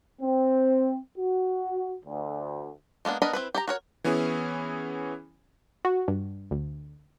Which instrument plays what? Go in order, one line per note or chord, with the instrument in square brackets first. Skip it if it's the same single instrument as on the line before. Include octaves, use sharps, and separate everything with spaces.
[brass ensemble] C4
F#4
D2
[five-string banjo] G#3 A#3 B3 D4
B3 D4 A#4 D#5 B5
C4 E4 B4
G4 C#5 A#5
F#4 A#4 C#5
[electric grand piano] E3 B3 C#4 E4 G#4
[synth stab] F#4
G2
D2